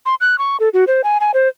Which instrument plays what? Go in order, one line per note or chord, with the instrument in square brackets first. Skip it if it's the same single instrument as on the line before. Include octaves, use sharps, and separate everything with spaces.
[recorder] C6
F#6
C#6
A4
F#4
C5
G#5
G#5
C5